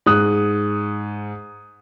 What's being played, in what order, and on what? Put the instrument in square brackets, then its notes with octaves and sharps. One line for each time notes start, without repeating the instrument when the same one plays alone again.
[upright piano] G#2 D#6 F#6